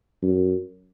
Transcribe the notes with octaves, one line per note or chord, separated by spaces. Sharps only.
F#2